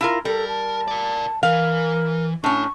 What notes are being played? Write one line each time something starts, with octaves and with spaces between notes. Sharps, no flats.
E4 F4 A#4
G3 A4 A#4
A5
A#4 D5
E3 A#4 F5
A2 C#4 D4 C#6